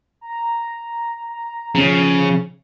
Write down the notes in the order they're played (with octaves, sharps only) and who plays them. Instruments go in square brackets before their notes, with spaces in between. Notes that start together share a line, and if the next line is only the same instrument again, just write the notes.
[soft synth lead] A#5
[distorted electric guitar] C#3 [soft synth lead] F3